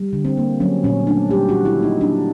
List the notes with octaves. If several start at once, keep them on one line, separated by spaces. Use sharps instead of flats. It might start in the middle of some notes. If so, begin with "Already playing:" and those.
Already playing: G3
D3
C4
A#3
F#3 C#4
A#2 C#4
A3 D4
G3 G4
D#3 F#4
E4
A#3
D#4
F#3 D4